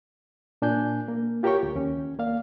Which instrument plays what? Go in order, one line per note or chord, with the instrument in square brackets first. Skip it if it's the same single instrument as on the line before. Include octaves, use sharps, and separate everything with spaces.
[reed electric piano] A#2 D4 G#5 G6
A#3
F4 G4 A#4 C#5 G5 C#6
D2
D#2 C#4
A#3 D5 F5